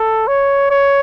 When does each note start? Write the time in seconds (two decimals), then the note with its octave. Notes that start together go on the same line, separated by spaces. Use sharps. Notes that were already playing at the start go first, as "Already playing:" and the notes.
Already playing: A4
0.28 C#5
0.71 C#5